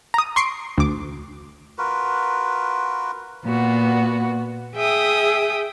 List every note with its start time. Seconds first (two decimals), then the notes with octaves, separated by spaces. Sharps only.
0.14 A#5 D#6
0.36 C6 C#6 C7 D7
0.78 D2 D6
1.78 F4 F#4 A#4 B4
3.44 A#2 B3 F#4
4.75 G#4 E5 G5 D#6